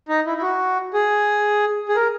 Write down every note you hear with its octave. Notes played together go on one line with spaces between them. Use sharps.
D#4
E4
E4
F#4
G#4
G#4
A#4